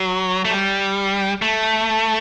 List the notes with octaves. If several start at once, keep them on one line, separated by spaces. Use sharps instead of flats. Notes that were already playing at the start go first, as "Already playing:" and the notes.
Already playing: F#3
A3
G3
A3